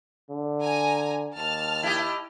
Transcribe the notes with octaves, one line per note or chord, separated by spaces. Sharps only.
D3
G#5 A#5
D#2 A5 F6
E4 G4 D#5